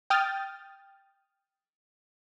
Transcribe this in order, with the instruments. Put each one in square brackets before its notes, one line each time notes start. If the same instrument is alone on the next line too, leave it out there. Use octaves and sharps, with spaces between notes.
[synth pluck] G5 D#6 F6 G6 A6